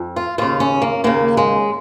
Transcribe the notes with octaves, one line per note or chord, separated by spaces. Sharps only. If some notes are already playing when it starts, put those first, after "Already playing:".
Already playing: F2
F4
D#2 C#3 F4
C#4
A#3
D#2 C#3 A#3
G#3